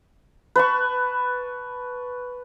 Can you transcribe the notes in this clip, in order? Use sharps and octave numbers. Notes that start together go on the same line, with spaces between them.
B4 A5 C#6